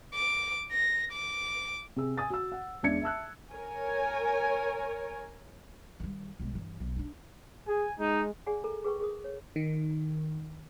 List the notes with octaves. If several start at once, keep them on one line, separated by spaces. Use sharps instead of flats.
D6
A#6
D6
C3 G#4 E6
G#5 D#6 A6
F#4 E6
F#5
E2 G#3 D4 E5 G#6 C#7
E5 A5 E6 F#6
A#4 C#5 G#5
D#3 G3
B1 G#3
G2 E3
B1
D4 D#4
G#4 G#5
G#3 D#4
G#4 D5 F#5 G#5
A4 A#4 A#5
G#4 B4 G5 C#6
G#4 A#4 D#6
C#5
D#3